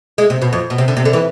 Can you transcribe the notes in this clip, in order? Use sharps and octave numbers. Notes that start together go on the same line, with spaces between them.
G#3
C3
B2
F2
B2
C3
D3
C3
D3
E3